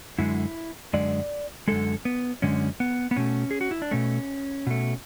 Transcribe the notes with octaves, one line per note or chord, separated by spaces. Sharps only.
F#2 D3 G#3 E4
F#2 D3 G#3 D5
F#2 D3 G#3 A4
B3
F#2 D3 G#3 C#4
B3
B3
B2 A3 C#4
G#4
F#4
E4
D4
B2 A3 C#4
B2 A3